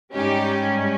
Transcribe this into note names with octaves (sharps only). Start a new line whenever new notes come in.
G#2 G3 C#4 D#4 G4